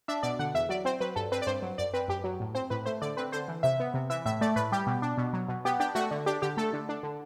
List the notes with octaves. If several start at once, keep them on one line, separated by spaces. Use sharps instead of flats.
D4 E5
B2 D5
D3 F#5
E2 E5
F#3 D5
C4 C5
F#3 B4
G2 A4
C4 B4
D5
G2 C5
F#3
F#2 D5
C4 B4
F#2 G4
F#3
A2
C4 C5
A2 B4
A3 C5
D3 D5
C4 B4
D3 C5
E3
C3 E5
B3
C3
E3 E5
A2 E5
A3 D5
A2 B4
G3 G4
B2
D4
B2
F#3
B2
B3 G4
D4 G4
A3 F#4
D3
D4 G4
D3 G4
A3 A4
D3
D4
D3